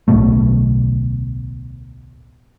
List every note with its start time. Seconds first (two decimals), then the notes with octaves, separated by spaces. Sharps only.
0.08 D1 B1 B2 A3